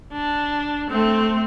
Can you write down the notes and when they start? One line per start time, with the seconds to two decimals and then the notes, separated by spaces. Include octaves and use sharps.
0.12 D4
0.90 A3 C4